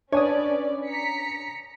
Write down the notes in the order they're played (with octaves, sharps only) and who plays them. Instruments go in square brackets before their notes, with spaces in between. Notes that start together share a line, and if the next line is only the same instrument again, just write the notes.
[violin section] C#4 B4 D5 [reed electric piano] D4 G#5 D#6 [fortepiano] C#5
[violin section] A#5 B6 C#7